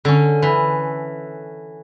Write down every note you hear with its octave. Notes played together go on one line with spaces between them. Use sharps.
D3 C#4
E3